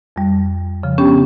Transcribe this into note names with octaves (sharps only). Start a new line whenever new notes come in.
F2 G3
C#3 F3
B3 C#4 D4 G4 G5